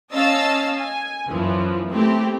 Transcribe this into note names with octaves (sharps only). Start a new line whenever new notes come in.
C#4 D#5 F5 A5 E6 A6
G#5
F#2 E3 F3
A3 C4 E4 G4